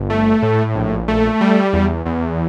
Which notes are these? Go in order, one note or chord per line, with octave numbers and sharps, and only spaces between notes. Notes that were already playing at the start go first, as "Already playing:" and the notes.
Already playing: G1
A3
A2
A#1
A3
G3
E2
E2